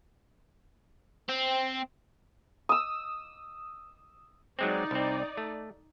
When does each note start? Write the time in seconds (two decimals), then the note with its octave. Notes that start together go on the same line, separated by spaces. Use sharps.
1.29 C4
2.69 D#6 E6
4.59 F#3 G#3 C4 D#4 D5
4.91 C2 C4
5.37 A3